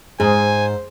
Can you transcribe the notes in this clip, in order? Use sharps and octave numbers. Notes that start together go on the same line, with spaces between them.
G#2 G#4 C5 G#5